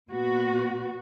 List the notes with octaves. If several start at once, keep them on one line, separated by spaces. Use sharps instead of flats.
A#2 B3 F#4